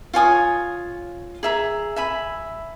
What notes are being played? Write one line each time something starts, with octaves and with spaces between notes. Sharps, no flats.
F4 C#5 G#5 D#6
G#4 E5 A#5
E5 G#5 B5